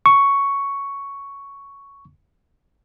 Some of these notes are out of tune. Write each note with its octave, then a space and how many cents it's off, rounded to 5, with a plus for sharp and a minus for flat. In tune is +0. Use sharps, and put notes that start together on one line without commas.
C#6 +5